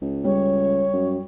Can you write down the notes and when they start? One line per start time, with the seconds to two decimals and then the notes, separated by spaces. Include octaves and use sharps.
0.02 C#2
0.24 G3 C#5
0.93 F#2